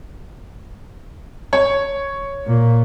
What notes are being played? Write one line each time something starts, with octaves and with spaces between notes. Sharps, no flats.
C#5
A#2